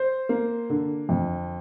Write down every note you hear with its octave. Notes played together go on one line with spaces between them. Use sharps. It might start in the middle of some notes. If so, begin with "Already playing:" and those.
Already playing: C5
A#3
D3
F2